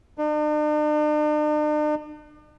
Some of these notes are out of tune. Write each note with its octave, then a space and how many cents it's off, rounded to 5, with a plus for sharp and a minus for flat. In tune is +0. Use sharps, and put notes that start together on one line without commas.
D4 +45